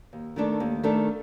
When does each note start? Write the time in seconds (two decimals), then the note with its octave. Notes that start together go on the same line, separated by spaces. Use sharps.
0.13 D#2
0.36 D#3 A3 D4 A4
0.60 D#2
0.83 D#3 A3 D4 A4